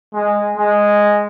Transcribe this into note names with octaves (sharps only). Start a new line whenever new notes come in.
G#3
G#3